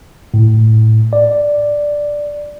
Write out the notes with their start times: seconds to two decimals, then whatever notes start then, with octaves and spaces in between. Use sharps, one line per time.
0.34 A2
1.13 D5